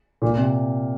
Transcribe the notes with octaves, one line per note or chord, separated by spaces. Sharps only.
A#2
C3